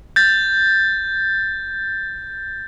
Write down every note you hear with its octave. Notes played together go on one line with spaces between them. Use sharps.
G6 A6